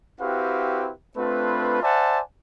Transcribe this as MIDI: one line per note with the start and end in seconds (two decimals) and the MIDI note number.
0.20 0.91 60
0.20 0.91 64
0.20 0.91 66
0.20 0.91 67
0.20 0.91 71
0.20 0.91 77
1.17 1.81 57
1.17 1.81 60
1.17 1.81 62
1.17 1.81 65
1.17 1.81 71
1.82 2.20 72
1.82 2.20 74
1.82 2.20 76
1.82 2.20 78
1.82 2.20 80
1.82 2.20 81